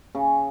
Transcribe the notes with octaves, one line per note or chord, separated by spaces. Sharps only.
C#3